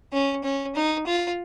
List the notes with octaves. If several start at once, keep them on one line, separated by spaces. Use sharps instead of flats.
C#4
C#4
D#4
F4